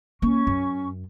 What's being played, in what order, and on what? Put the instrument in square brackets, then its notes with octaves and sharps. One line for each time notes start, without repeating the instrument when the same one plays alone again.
[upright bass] A#3 [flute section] C#4 C#6
[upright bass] F#2